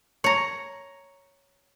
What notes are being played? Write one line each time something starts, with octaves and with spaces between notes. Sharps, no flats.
C#5 A#5